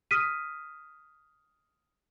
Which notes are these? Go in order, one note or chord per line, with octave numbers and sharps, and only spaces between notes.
D#6 F6 B6 D#7